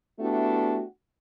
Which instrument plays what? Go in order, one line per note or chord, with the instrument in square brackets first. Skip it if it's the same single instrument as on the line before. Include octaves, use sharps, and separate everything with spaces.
[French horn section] A3 B3 D4 E4 F#4 G4